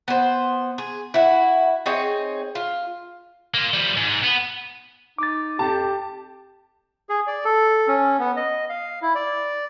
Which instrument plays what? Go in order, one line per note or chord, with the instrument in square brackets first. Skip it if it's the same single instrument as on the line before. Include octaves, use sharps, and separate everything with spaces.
[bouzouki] B3 C5
G#4
E4 F#4
C4 D#4 G#4 C#5
F4
[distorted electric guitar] A#3 F4
F3 G3
G#2
B3
[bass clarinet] D#4 [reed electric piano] D6 A6
[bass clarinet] F2 [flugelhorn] G4 [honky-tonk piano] A5
[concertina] G#4
D5
A4
C#4
B3
D#5
F5
E4
D5